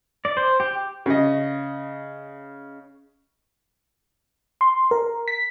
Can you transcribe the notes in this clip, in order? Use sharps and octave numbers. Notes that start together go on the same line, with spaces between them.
D5
C5
G4
C#3 D#5
C6
A#4
B6